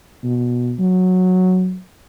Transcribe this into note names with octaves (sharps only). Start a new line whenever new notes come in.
B2
F#3